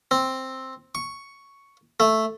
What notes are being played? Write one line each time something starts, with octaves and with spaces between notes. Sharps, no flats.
C4
C#6
A3